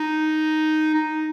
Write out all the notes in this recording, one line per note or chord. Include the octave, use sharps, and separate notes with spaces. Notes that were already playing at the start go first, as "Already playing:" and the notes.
Already playing: D#4
D#4